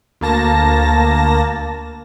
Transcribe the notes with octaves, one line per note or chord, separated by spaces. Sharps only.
D2 A#3 A5 A#6